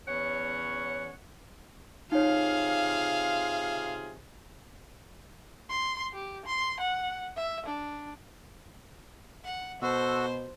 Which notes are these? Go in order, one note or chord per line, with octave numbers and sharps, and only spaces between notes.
E2 C#4 C#5 F#5
C3 D#4 F4 G#4 C#5 F5
C6
G4
C6
F#5
E5
D4
F#5
B2 F#4 A4 C5 E6